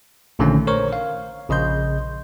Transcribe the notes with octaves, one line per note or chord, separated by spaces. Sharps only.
A#1 A#2 D3 D#3 A3 C#4
A#4 C5 C#5 C#6
F5
A#1 C#3 D#5 C6 G6